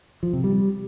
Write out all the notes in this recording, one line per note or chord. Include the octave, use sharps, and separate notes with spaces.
F3
C3
G3